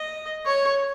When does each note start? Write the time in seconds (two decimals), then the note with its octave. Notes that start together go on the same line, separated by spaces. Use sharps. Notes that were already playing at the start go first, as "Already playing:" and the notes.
Already playing: D#5
0.46 C#5